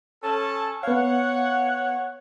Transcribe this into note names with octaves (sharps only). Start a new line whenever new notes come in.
C#4 A4 A5
B3 C#5 F5 F#5